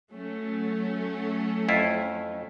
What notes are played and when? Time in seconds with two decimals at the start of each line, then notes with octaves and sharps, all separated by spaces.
0.11 F#3 A3 C#4
1.69 F2 E4 F4